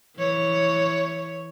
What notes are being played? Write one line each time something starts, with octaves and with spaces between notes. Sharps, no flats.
E3 C#5